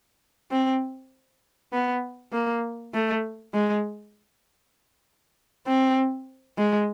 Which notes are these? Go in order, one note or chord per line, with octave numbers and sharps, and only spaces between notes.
C4
B3
A#3
A3
G#3
C4
G#3